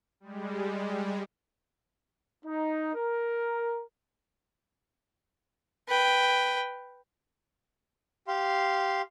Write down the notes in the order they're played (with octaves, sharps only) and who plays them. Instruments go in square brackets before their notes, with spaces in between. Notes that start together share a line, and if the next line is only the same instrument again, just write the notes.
[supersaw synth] G3 G#3
[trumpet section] D#4
A#4
[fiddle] B4 G5
[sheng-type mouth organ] G4 F5 C6